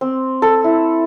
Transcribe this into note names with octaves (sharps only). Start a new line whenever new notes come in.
C4
A4
E4